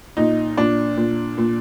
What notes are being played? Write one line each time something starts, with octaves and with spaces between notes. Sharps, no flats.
A#2 D#4
A#2 D4
A#2
A#2